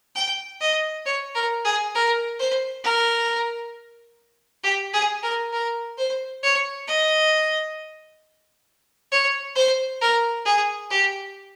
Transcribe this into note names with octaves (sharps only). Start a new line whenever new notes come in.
G5
D#5
C#5
A#4
G#4
A#4
C5
A#4
G4
G#4
A#4
A#4
C5
C#5
D#5
C#5
C5
A#4
G#4
G4